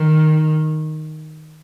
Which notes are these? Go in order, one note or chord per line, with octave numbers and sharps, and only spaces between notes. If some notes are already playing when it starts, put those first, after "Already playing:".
Already playing: D#3